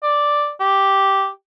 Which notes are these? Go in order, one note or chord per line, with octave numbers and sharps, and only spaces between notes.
D5
G4